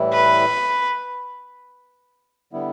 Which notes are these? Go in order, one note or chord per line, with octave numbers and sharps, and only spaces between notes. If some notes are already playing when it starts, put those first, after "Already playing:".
Already playing: A2 E3 G3 E4
B4
D3 G3 B3 E4